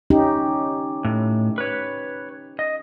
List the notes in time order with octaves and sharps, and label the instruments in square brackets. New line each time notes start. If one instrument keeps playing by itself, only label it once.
[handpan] C#4 D#4 G4
[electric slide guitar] A2
B4 C#5
D#5